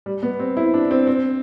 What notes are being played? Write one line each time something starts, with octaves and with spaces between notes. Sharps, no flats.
G3
B3
C4
E4
D4
C4
C4